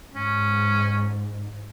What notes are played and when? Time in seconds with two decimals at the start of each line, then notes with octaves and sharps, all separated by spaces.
0.13 G#2 C#4